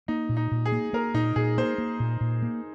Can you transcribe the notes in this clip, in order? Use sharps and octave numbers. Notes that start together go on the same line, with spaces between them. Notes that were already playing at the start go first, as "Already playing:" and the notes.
A#3 D#4
A#2
D#4
A#2
G#4
A#3
A#3 A#4
A#2 D#4
A#2 G#4
A#3 C5
A#3
A#2
A#2
A#3